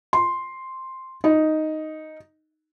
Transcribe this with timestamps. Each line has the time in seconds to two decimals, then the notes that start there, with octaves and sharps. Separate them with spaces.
0.13 C6
1.24 D#4